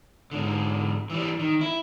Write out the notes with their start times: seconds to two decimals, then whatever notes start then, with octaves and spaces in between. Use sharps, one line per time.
0.31 G#2 D3
1.10 E3 G3
1.39 D#3
1.61 E4